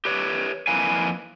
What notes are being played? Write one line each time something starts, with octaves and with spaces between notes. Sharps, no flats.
G4 B4 C#5
F2 A#3 E4 B4 F5 G#5